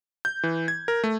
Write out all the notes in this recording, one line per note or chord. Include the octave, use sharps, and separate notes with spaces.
G6
E3
G#6
A#4
A3